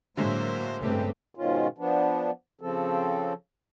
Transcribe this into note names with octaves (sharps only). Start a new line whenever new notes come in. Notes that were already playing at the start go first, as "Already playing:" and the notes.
A2 D3 F#3 G#3 A#3 C5 E5
G2 C#3 A3 C4 G4 B4
G#2 B2 D#3 C#4 F4
F3 B3 D4
C#3 F3 C4 A4